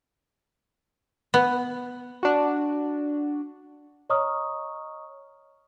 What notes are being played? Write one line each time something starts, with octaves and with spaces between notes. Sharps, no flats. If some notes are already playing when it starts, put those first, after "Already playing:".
B3
D4 F#4
C#5 D#5 A#5 C#6 D#6 F6